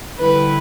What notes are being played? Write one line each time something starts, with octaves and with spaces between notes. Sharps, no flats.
D3 G3 E4 B4